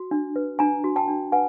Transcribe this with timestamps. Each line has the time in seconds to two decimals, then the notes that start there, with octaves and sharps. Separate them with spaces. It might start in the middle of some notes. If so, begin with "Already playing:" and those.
Already playing: F#4
0.11 D4
0.36 B4
0.59 D4 G#5 A#5
0.84 F#4
0.96 G5 A5
1.08 D4
1.32 B4 F#5 G#5